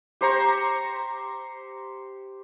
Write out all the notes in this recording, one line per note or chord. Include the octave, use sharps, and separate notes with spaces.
G4 C5 A#5 C#6